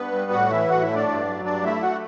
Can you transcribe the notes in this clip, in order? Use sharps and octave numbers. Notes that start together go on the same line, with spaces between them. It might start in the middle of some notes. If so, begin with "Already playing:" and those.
Already playing: G2 B3 B4
G3
A2 F#4 F#5
E3 E4 E5
A2 F#4 F#5
E4 E5
A3
D4 D5
G2
F#3
G2 D4 D5
A3 E4 E5
F#4 F#5